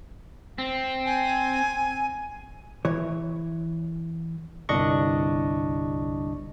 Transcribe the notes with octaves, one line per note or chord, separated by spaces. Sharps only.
C4
G#5
E3 C#5
G1 C2 D4 D#5 C#6